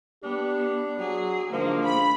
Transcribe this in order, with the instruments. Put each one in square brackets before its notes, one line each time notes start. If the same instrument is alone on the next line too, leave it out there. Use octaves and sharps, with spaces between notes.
[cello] B3 [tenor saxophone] D4 [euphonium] G4
[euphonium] F#3 [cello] G#4
[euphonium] G#2 [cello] D3 [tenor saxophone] F3 [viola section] A#3
[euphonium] C#3 [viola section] B5